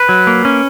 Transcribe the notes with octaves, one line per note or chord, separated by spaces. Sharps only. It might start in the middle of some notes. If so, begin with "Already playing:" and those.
Already playing: B4
F#3
A#3
C#4